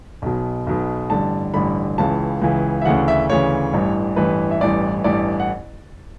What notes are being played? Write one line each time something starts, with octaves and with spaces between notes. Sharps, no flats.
B1 B2
B1 B2
A1 G2 D3 A5
A1 G2 D3 B5
C#2 C#3 E3 A5
C#2 C#3 E3
E5
D2 C#3 E3 F#5
E5
D2 C#3 E3 C#5
A1 G2 E3
A1 G2 E3 B4
E5
A1 G2 E3 D5
A1 G2 E3 D5
F#5